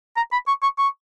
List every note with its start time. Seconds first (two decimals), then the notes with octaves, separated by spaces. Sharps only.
0.17 A#5
0.32 B5
0.48 C#6
0.63 C#6
0.78 C#6